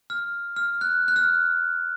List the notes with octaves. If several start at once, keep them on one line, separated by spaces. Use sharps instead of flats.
F6
F6
F#6
F#6
F6